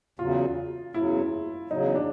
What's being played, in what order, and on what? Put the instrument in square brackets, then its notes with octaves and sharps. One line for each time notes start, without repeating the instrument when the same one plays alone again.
[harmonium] E2 C#3 F#3 [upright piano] F4
[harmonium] E2 C#3 F#3 [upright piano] E4
[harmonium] E2 C#3 F#3 [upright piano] D#4
[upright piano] D4